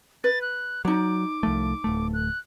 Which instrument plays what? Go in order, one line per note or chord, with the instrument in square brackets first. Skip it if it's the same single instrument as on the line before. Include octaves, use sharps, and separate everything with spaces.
[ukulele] B4 [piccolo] A6
[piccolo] F#6
[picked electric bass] F#3 [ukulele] D#4 D5 [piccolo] D6
[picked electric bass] C2 F3 A3
D1 A3
[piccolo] F#6